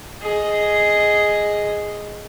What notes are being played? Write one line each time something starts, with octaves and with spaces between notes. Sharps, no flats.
G#4 D#5